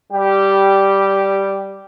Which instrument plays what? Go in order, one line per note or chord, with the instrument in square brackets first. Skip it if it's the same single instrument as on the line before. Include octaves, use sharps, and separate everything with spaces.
[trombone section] G3 G4